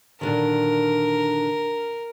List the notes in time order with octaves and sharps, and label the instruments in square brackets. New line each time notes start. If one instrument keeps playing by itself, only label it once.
[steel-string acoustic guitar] A#2 D3 D#3 [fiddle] A#4